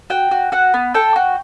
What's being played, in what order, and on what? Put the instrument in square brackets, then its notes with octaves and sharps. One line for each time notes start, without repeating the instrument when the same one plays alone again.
[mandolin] F#4 G5
F#4
F#4 F#5
B3
A4 G5
F#4